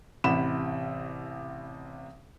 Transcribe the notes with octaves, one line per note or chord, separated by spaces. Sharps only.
A1 C3 E4 F#5 B5 E7